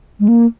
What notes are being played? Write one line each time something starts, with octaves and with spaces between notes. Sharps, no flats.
G#3
A#3